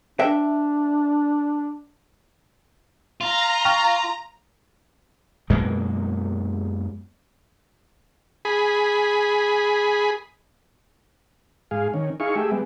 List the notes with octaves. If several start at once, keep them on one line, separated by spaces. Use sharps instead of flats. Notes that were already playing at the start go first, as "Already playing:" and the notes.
D4 E5 G5
F4 A#5
G5 C#6 F6
F#2 B2 G#3 A#3
G#4 B5
G#2 G#4 F5
D#3 C#4
D#4 E4 G#4 F5 C#6
A3 G4 G#4 E5
G3 G#3 B3